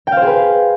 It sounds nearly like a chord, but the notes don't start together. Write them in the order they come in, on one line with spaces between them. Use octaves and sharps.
G5 F5 C5 G#4 B4